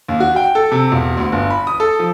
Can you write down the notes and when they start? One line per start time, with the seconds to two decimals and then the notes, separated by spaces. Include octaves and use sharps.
0.09 D#2
0.20 F#4
0.36 G5
0.55 A4
0.72 C3
0.92 E1
1.17 D2
1.32 G1
1.50 B5
1.67 D#6
1.80 A4
1.99 F3